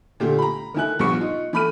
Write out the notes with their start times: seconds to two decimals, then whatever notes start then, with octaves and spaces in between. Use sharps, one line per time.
0.20 A#2 D3 A3 F4 G4
0.38 A#5 B5
0.74 D#3 A3 E4 G#5 F#6
0.99 A#1 G2 G3 B3 C#6 C#7
1.21 D#4 F4
1.53 E3 A3 B5 F6 D#7